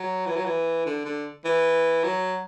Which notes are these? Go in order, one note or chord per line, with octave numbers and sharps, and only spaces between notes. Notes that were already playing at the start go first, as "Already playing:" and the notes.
Already playing: F#3
E3
F#3
E3
D3
D3
E3
F#3